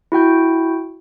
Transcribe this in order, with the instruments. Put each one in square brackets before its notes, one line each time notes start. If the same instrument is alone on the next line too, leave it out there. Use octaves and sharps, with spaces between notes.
[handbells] E4 F#4 G5 G6